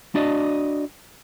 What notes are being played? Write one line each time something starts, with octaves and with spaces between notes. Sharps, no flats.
D4 F#4 D5 D#5